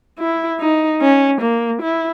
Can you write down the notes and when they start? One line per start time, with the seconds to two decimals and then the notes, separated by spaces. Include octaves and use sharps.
0.19 E4
0.60 D#4
1.01 C#4
1.41 A#3
1.82 E4